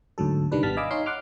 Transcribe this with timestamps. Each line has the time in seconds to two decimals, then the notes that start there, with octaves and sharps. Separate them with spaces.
0.18 D2 G#2 F#3 A4
0.52 C2 D#3 G3 D4 B4
0.63 G#1 G3 B3 A5 F6 B6
0.77 D#5 F5 G#5 B5 D6 E6
0.91 D#4 C#5 F5 G#5 C6
1.06 F#5 C6 D6 F6